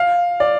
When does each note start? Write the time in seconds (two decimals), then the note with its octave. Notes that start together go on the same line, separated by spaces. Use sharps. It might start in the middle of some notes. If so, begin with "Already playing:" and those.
Already playing: F5
0.40 D5